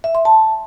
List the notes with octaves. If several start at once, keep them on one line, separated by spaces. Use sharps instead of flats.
E5
C6
A5